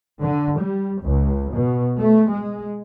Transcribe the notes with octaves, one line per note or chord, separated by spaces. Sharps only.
D3
G3
C#2
B2
A3
G#3